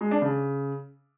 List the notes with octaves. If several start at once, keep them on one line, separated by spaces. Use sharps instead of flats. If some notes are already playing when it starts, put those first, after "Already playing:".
G#3
D4
C#3